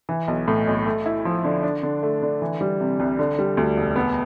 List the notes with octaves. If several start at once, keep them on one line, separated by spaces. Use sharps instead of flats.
E3
B1
A2
B1
A3
E4
F3
D3
D4
D3
A3
D3
E3
G3
C3
C2
D3
G3
D2
E1
B3